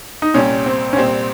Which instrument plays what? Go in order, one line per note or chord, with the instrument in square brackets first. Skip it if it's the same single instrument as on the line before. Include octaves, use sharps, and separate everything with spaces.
[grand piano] D#4
[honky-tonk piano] C2 A#2 G3 [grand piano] C#4
[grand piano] C4
C#4
[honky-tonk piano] C2 A#2 G3 [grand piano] C4